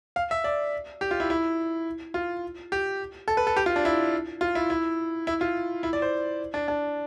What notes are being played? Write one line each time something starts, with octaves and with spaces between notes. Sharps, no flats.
F5
E5
D5
G4
F4
E4
E4
F4
G4
A4
B4
A4
G4
F4
D4
E4
F4
E4
E4
E4
F4
E4
D5
C5
D4
D4